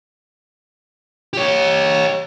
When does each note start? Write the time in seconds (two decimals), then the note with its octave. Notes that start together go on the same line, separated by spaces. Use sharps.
1.33 G4 C#5